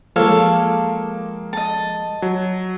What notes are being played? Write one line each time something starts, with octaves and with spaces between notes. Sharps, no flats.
F3 G#3 A#3 G4 A4 C#5 F5
D#5 A5
F#3